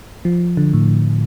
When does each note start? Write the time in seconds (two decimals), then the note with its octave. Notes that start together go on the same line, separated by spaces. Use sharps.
0.25 F3
0.57 D3
0.74 A2